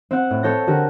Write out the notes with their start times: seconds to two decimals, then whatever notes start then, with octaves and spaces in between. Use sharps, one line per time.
0.11 C4 F#5
0.31 A2
0.43 C4 A4 C#5 G6 A#6
0.67 D3 F#4 G4 A#4